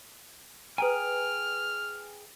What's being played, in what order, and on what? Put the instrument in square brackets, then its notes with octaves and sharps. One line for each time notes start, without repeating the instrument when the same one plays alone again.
[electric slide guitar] G#4 G5 G#5 [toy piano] B4 A#5 [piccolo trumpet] F6